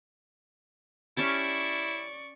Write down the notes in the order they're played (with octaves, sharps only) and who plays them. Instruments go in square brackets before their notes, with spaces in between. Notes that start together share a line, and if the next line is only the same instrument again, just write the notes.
[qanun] C#4 G4 A5 [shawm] E4 [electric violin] D5 C#6